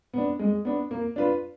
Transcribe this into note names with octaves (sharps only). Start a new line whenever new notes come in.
B3 D4
G#3
B3 D4
A#3
D4 F4 B4